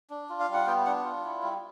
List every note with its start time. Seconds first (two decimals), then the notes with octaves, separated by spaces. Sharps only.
0.10 D4
0.29 F4
0.40 F5
0.48 G3
0.53 F#5
0.67 B3 G5
0.86 D4 F#5
1.04 F4
1.24 E4
1.43 G3